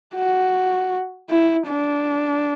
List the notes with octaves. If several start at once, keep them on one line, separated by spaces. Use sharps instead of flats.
F#4
E4
D4